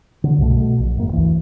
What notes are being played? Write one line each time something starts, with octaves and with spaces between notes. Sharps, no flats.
D3
C2 G2 B2 A3
B2 A3
A#1
G#1 F#2 A#3
D2 G2 E3